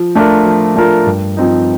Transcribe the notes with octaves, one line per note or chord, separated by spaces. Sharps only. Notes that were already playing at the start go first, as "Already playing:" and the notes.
Already playing: F3
A3 D4 F4 A#4
F3
A3 D4 F4 A#4
G2
F3 C4 D#4